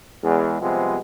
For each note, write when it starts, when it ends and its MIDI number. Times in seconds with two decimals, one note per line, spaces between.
0.24 0.57 40
0.24 0.57 56
0.61 0.97 48
0.61 0.97 53
0.61 0.97 55
0.61 0.97 56
0.61 0.97 59